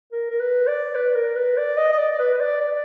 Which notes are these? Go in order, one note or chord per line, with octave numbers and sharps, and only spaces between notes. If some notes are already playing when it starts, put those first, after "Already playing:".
A#4
A#4
B4
D5
B4
A#4
B4
D5
D#5
D#5
D5
B4
B4
D5
D5